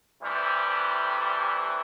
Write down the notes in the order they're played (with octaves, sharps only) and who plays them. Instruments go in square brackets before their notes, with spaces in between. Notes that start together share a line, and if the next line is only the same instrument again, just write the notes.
[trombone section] D2 C3 E3 G3